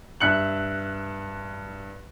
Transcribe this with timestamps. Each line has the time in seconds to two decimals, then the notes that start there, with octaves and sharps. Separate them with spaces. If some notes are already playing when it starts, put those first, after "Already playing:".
0.20 G2 E5 F#6 C#7 F#7